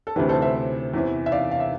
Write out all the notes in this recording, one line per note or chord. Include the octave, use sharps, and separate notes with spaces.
A4
D2 C3 E3 G4 B4
A4 C5
C5 E5
E2 C3 E3
E5
D5 F5
F5
E5